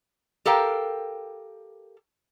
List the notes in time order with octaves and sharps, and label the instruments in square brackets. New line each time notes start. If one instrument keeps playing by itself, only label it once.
[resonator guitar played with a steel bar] G4 A4 A#4 F5 G5